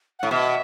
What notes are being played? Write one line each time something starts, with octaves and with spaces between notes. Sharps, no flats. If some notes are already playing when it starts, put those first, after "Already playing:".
A2 F#5
B2 E5